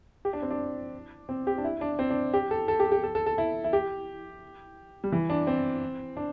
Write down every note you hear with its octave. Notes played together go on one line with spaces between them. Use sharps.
G4
D4
C4
D4
C4
G4
D4
E4
D4
C4
D4
G4
A4
A4
G4
G4
A4
A4
A4
E4
E4
G4
G3
E3
D4
C4
D4